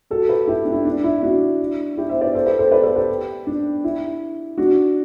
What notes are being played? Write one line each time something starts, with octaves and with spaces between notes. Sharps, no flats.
F#4 A4
G4 B4
E4 G4
D4
E4
D4
E4
D4 F#4
E4 G4
C5 E5
B4 D5
A4 C5
G4 B4
A4 C5
B4 D5
A4 C5
G4 B4
D4
E4
D4 F#4